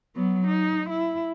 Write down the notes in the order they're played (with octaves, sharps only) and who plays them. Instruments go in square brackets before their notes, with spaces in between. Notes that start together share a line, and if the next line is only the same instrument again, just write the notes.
[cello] F#3 B3
D#4
E4